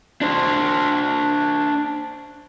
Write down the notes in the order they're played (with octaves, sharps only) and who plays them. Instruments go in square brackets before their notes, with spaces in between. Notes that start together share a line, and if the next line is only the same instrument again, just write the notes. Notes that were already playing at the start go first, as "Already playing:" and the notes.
[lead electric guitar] D4 C5